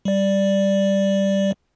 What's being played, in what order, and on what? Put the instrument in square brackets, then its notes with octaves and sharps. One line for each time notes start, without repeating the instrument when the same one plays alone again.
[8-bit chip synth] G3 D5